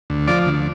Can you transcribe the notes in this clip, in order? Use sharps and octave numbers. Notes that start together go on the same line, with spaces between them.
D2
F3 D5
D2